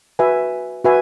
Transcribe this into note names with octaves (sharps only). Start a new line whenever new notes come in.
F#4 B4 E5 G#5
F#4 B4 E5 G#5